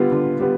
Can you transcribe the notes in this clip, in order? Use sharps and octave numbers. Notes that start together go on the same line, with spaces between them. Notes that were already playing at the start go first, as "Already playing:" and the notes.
Already playing: D3 G3 B3 F4
D3
G3 B3